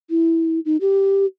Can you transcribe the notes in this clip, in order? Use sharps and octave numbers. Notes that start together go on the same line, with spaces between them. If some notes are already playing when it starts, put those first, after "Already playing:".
E4
D#4
G4